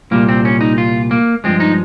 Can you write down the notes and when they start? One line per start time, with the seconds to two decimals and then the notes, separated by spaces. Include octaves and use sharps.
0.11 C2 A#2 G3 A#3
0.28 C4
0.45 C#4
0.61 D#4
0.78 F4
1.11 A#3
1.44 G2 F3 G#3 C4
1.60 D#4